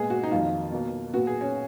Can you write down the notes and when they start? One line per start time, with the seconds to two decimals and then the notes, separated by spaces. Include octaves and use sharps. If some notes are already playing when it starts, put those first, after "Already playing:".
Already playing: A#2 G#3 B3 G#4
0.10 F#4
0.23 D#4
0.31 F2 D#3 F#3 A#3 F4
0.72 B2 F#3 A#3
1.13 A#2 F#3 B3 F#4
1.27 G#4
1.41 C#4